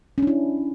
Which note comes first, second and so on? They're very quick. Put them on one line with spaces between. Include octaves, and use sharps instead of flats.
C#4 D4 E4